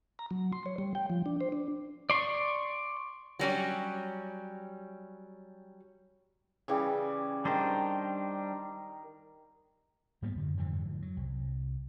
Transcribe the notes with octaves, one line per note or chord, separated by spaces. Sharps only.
A#5
F#3
C6
C#5
G3
G5
F3
D4
C5
D4
D5 C6 C#6
F#3 G3 C#4
C#3 E3 G3
D#3 G3 D4 A#4 C5
G#2 G3 A#3 B3
F#2 D3
F2 G#2 D3 E3
F#3
C2